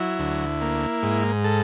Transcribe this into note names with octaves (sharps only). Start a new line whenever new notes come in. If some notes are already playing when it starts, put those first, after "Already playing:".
Already playing: F#3 E4
D2
A#3
G#2
A4